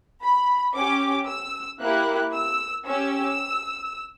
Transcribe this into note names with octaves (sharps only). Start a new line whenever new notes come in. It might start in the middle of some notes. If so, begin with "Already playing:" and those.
B5
C#4 G4 D6
E6
A#3 E4 G4 F#6
E6
C#4 G4 E6